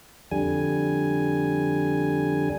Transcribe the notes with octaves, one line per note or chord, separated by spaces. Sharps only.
F2 D3 G3 G#5